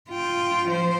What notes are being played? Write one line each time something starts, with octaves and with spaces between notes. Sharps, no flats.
F4 G5
F3 C5